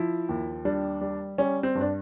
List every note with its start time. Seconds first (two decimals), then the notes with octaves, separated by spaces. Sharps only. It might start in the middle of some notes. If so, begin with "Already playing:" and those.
Already playing: F3 E4
0.29 D#2
0.65 G3 D4
1.01 G3
1.38 G3 C#4
1.63 C4
1.75 G2
1.81 D4